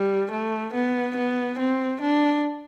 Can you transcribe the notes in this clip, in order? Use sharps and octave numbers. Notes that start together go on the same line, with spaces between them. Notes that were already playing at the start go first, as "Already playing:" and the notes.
Already playing: G3
A3
B3
B3
C4
D4